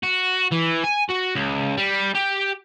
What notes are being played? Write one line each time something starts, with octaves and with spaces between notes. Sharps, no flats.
F#4
E3
G#5
F#4
C#2
G3
G4